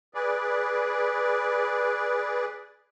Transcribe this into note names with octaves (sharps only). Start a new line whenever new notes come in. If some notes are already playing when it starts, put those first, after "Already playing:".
G#4 B4 D5